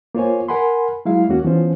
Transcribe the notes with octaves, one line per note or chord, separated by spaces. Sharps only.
A#3 F4 C5 C#5 G#5
A#4 F#5 G#5 B5 C6
F#3 G#3 E4 F5
D#2 A#3 C#4 F#4
E3 F3 B3 C#4 F4 C5